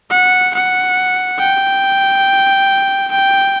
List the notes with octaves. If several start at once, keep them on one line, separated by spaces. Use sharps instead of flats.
F#5
F#5
G5
G5